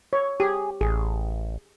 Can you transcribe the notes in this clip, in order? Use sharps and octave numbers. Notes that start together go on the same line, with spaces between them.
C#5
G4 G#4
A1 G#4